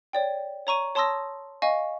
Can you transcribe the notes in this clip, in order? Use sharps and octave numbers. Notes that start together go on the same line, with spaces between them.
C#5 D5 G5
C#5 A#5 C#6 D#7
C#5 A5 C6 D#6 E6 A#6
D#5 F5 G#5 C#6